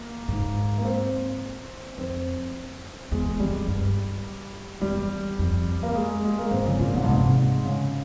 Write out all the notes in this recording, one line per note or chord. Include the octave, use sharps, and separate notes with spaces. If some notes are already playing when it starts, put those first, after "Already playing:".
Already playing: A#3
G#2
A#3
C4
F2 C4
E2 G#3
F2 G3
G2
E2 G3
F2
A#3
G#3
G#3
A#3
G#2 C4
C#3 F3
A#2 E3
G#2 C3
G2
G#2 C3
C#3